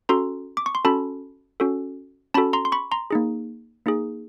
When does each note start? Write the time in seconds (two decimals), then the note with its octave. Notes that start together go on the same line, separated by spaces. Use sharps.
0.09 C#4 F#4 A4 A#5 C6
0.57 D6
0.66 C#6
0.75 C6
0.85 C#4 F#4 A4 A5 B5
1.60 C#4 F#4 A4
2.34 C#4 F#4 A4 A5 B5
2.53 A#5 C6
2.65 C6
2.72 B5 C#6
2.92 A#5 C6
3.11 A#3 D#4 G#4
3.86 A#3 D#4 G#4